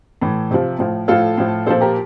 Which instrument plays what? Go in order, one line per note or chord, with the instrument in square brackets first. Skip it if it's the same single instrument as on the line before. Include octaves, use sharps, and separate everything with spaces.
[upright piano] A2 E3
C3 F3
A2 F3
A2 F3 F4 A4
A2 F3
A#2 F3 A4 C5
G4 A#4